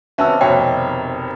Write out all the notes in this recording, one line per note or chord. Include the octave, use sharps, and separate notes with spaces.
C3 D#3 B3 C#4 F#4 E5 A5 E6
F1 B2 C#5 G5